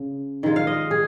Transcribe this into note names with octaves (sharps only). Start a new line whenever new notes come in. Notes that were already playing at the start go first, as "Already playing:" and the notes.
Already playing: C#3
D#3 G#3 F4
F5
D#5
G#4